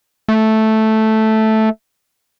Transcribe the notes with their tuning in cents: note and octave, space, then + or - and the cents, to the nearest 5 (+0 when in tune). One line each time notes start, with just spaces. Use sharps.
A3 -5